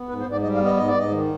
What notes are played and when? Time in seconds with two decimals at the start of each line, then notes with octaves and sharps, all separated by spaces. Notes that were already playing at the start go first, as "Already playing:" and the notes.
Already playing: B3
0.09 G#2 B4
0.20 C5
0.26 G#2
0.32 D5
0.43 G3 D#5
0.55 F5
0.60 B3
0.66 D#5
0.77 G#2 D#5
0.88 D5
0.94 G#2 D#5
1.11 D#3